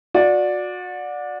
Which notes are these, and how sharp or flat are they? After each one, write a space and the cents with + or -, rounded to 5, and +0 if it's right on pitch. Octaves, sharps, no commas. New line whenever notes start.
F#4 -30 D5 +0